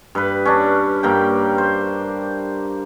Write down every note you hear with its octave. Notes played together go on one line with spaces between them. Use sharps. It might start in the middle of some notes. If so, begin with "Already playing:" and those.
G2 B4
C#4 D4
G2 A#3 G5
C5